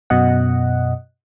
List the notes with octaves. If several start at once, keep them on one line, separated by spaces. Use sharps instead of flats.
F#2 B2 D#5 F#5